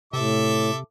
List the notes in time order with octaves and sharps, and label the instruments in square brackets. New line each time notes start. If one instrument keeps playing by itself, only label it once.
[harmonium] A2 [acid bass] C3 [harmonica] A4 E5 D6